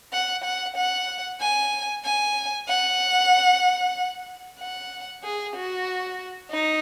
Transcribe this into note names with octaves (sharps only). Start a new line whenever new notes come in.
F#5
F#5
F#5
G#5
G#5
F#5
F#5
G#4
F#4
D#4